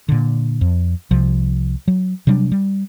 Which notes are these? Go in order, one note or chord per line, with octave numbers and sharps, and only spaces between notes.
A#2 D3
F2
C2 C3 F3
F#3
C3 F#3 G3 D4
G3